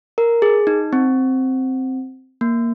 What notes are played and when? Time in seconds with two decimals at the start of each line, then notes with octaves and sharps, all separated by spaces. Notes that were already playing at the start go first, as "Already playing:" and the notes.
0.18 A#4
0.42 G#4
0.67 D#4
0.93 C4
2.41 A#3